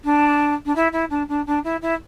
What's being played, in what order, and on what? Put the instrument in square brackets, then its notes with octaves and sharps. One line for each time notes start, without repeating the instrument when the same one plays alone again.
[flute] D4
D4
E4
E4
D4
D4
D4
E4
E4